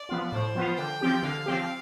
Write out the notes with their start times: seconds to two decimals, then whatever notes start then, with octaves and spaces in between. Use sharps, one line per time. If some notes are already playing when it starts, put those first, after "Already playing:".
Already playing: D5
0.09 F3 B3 F4
0.32 A2 C5
0.55 F3 B3 F4
0.77 D3 G5
1.01 F3 C4 G4
1.23 D3 F5
1.46 F3 C4 G4